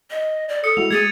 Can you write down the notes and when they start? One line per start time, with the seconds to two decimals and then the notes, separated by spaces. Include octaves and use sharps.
0.10 D#5
0.49 D5
0.64 A4 D#6 C#7
0.77 G#3 E4 F#4 F7
0.91 G#3 G#4 G#6 A6 D#7